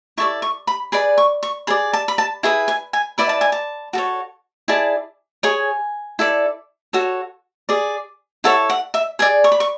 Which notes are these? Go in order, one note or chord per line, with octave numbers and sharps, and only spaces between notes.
E4 A4 D5 C#6
C#6
B5
G#4 B4 D5 B5
C#6
C#6
G#4 D5 B5
A5
B5
A5
E4 G#4 B4
G#5
G#5
E4 B4 D5 B5
A5
G#5
A5
F#4 A4 C#5
E4 G#4 D5 A5
G#4 C#5 G#5
E4 A4 D5
F#4 A4 C#5
G#4 D5
E4 A4 C#5 F#5
F#5
E5
G#4 D5 G#5
C#6
B5
C#6